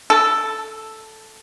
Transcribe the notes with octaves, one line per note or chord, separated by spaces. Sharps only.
A4